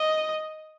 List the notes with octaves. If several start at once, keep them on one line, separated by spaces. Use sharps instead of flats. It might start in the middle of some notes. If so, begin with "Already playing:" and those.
Already playing: D#5